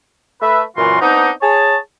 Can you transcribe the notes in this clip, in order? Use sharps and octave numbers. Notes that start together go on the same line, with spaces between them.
A3 B4 E5
F#2 A#2 E3 F4 F#4 C6
B3 C4 D4 D#4
G#4 C#5 A5